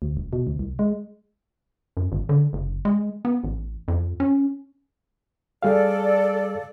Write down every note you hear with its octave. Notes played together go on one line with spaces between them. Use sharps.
D2
D#1
B2
D2
C2
G#3
F#2
G#1
D3
F#1
G#3
B3
A1
F2
C#4
G3 G#4 A4 D5 F5